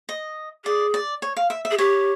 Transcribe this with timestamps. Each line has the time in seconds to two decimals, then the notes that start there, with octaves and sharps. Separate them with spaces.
0.09 D#5
0.65 G#4 D5
0.94 D5
1.22 C#5
1.37 F5
1.50 E5
1.65 E5
1.71 G#4
1.78 G4 C#5